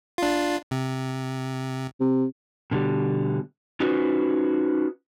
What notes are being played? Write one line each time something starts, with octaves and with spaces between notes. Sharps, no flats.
D4 F4
C3
C3
B2 D3 G3
C#4 D#4 F4 F#4 B4 C5